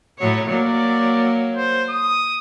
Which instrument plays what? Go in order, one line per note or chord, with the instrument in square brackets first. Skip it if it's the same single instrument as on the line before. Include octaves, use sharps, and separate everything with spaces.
[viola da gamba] A2 F#3 C#5
[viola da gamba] F#3 A#3 [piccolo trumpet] D5
[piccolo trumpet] C5
D#6